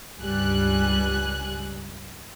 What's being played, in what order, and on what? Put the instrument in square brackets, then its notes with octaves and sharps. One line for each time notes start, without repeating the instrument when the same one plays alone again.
[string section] C#2 G2 G3 G#5 F#6